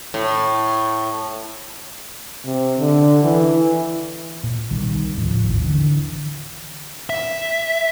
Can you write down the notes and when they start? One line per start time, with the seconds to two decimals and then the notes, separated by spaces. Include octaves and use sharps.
0.14 A2
2.45 C3
2.78 D3
3.24 E3
4.43 A#2
4.71 C2 D#3 G3
5.17 D#1 A2 C#3 F3
5.44 G#1 D#2
5.64 D3 E3
7.10 E5